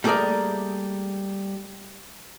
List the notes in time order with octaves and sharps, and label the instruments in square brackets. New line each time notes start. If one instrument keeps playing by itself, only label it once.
[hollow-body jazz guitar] G3 A3 A#3 G#4 A#4 D5